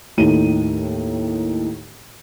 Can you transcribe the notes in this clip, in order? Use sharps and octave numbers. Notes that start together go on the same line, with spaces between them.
D#2 A2 D#4 D#7